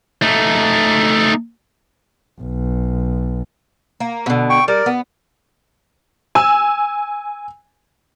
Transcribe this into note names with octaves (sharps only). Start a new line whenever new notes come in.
A3 D#4
B1
A#3
B2 D3
G5 C#6
G3 A#4 D5
B3
G#5 E6